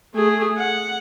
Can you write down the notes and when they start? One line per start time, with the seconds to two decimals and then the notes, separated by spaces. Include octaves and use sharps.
0.14 A3 G#4
0.57 F#5